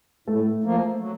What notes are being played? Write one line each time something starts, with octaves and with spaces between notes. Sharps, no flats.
A2 A3 A4
F3 A#3
F#3